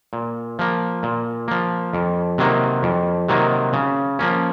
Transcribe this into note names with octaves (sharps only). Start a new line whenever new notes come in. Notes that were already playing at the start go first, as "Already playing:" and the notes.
A#2
F3 A#3
A#2
F3 A#3
F2
C3 D#3 F#3 A#3
F2
C3 D#3 F#3 A#3
C#3
F3 A#3 C#4